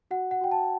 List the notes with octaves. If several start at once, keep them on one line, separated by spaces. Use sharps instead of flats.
F#4 F#5
F#5
F#4 G5
A5